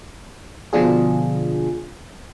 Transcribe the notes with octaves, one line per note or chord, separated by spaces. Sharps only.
B2 D3 F3 D4 F4 G#4